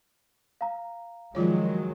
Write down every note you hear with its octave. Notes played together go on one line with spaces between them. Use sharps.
F5 A#5
D#3 F3 F#3 G#3 F4 C#5